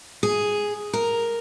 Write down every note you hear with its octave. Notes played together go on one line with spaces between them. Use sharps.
G#4
A#4